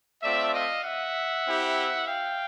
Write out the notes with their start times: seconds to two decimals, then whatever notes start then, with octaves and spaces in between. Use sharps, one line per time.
0.23 A3 C4 F4 D5 E5
0.54 D#5 F5
0.84 E5 F#5
1.46 C4 E4 G4
2.08 F5 G5